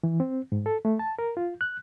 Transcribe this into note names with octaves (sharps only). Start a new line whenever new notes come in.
E3
C4
G#2
A4
A3
A5
A#4
F4
F#6